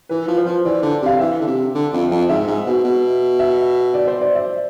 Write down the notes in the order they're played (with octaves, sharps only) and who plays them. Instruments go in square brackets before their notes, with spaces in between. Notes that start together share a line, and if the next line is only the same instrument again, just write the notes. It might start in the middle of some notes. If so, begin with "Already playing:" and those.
[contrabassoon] E3 [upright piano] B4
[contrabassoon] F3
[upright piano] C5
[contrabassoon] F3
[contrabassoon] E3 [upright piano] D5
[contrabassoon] D3
[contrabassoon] C3 [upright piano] F5
[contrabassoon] E3 [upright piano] E5
[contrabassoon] D3
C3
D3
F2
F2
[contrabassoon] G#2 [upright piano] E5
[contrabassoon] G#2
B2
B2
[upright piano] E5
D5
C5
D5
E5